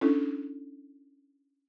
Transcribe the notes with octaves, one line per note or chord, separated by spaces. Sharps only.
C#4 D4 E4 A4